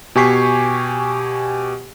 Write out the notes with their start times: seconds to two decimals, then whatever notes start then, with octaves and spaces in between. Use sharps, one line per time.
0.15 B2 G4 G#5 C#6 B6 C7